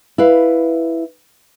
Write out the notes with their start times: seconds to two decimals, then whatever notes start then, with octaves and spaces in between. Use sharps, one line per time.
0.18 E4 B4 F5